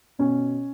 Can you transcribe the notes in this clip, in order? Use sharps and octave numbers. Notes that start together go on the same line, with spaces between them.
B2 C#4